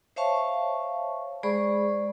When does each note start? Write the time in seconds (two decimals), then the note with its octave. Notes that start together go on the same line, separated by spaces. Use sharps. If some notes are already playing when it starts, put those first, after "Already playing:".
0.16 C5 C#5 E5 F5 A5 C#6
1.43 G#3 G#4 C5 D5 B5 C#6